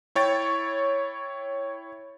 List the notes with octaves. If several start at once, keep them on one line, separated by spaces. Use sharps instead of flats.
E4 C#5 G5 A6